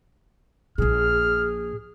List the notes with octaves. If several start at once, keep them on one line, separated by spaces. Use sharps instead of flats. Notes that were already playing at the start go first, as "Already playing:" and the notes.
A#1 A#2 G#4 F6